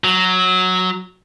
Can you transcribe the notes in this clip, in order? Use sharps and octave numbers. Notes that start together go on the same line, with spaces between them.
F#3